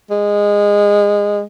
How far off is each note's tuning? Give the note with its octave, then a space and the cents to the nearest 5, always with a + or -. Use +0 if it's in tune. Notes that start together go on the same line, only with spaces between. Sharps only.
G#3 -20